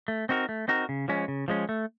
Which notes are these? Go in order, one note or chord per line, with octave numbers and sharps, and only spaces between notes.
A3
C4 D#4 F#4 A#4
A3
C4 D#4 F#4 A#4
C#3
F3 G#3 C#4
C#3
F3 G#3 C#4
A3